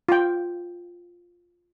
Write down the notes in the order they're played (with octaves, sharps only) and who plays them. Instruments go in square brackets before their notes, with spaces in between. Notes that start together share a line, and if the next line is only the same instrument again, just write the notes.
[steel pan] F4 G5